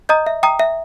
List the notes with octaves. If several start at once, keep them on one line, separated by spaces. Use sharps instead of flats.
D#5 A#5 D#6 G6
E5
G5 A#5 D#6
E5